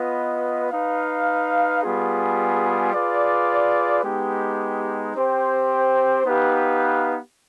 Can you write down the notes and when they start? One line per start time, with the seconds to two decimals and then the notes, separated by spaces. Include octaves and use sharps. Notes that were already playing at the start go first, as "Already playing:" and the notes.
Already playing: B3 F4 B4 D#5
0.71 D#4 B4 F5
1.83 G3 B3 F4 G#4
2.94 F4 G#4 B4 D5
4.04 G#3 B3 D#4 G4
5.15 C4 G4 C5 G5
6.25 B3 D#4 G4 B4 F5